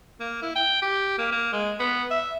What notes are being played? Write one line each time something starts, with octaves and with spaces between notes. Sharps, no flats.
A#3
E4
G5
G4
A#3
A#3
G#3
B3
E5